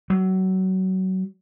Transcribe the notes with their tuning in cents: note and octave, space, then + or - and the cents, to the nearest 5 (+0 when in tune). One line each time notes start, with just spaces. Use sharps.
F#3 +25